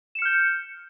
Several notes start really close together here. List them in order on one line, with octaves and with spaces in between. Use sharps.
E7 C#7 F6 G6